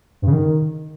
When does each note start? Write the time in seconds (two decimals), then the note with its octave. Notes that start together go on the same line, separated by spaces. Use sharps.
0.22 G2
0.27 C#3
0.32 D#3